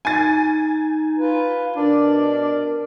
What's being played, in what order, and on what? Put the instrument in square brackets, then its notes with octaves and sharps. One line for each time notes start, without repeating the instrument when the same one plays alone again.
[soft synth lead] D#4 [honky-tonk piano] G#5 A6
[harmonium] F4 B4
[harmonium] B2 D5 [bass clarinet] D4 [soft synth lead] A#4